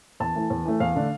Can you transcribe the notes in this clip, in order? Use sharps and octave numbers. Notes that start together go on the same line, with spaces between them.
E2 A5
E3 A3
E2
E3 A3
E2 F5
D3 A3 D4